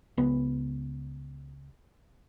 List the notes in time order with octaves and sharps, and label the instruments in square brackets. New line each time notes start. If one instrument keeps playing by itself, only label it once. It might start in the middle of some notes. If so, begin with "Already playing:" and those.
[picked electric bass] C#2 B3